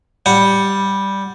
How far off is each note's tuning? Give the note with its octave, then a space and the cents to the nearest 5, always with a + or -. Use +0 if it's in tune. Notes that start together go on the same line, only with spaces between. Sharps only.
G3 +0 F#5 +0